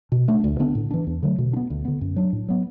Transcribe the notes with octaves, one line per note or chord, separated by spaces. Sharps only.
B2
A3 D4
D2
D3 B3 D4
A2
E3 D4
E2
D3 F#3 A3
B2
D4
B3
D2
D3 B3
F#2
F#3 D4
A2
F#3 B3